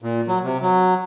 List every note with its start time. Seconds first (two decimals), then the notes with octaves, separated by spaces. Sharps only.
0.02 A#2
0.28 F#3
0.44 C3
0.62 F#3